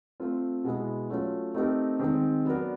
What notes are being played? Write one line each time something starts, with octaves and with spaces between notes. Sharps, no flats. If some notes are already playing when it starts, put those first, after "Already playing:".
A3 C4 F4
B2 G#3 B3 E4
F#3 A3 C#4 F4
A3 C4 D#4 G4 A#4
D#3 G#3 C4
F#3 B3 D4 F#4 A#4